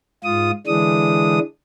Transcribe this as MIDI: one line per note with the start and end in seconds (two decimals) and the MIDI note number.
0.24 0.51 44
0.24 0.51 65
0.24 0.51 87
0.67 1.39 50
0.67 1.39 52
0.67 1.39 56
0.67 1.39 62
0.67 1.39 87